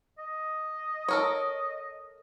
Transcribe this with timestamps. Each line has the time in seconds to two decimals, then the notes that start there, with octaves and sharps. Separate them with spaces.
0.18 D#5
1.08 A4 A#4 C#5